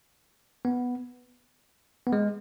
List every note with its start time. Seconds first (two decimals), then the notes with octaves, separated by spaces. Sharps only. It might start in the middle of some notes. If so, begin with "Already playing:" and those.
0.65 B3
2.07 B3
2.13 G#3